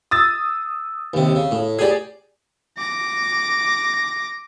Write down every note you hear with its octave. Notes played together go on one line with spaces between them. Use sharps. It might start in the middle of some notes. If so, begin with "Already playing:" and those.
D#6 E6 A6
D#2 C3
C#3
A2
G4 G#4 D5 G#5
D6 A#6